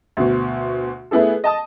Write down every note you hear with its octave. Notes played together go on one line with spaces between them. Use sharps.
D2 B2
A3 B3 E4 G#4 A4
D#5 A5 D#6